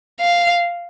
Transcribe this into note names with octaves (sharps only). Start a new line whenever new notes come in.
F5